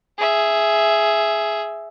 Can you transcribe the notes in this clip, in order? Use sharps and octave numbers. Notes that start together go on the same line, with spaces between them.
G#4 E5